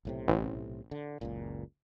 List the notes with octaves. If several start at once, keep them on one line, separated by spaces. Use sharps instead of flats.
B1 A2 C3
A1
D3
F#1 C#2 A#2